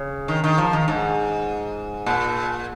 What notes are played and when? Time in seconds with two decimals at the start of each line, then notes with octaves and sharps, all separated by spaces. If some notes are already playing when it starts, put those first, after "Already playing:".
Already playing: C#3
0.28 D#3
0.44 D#3
0.58 F3
0.73 D#3
0.88 G#2
2.06 A#2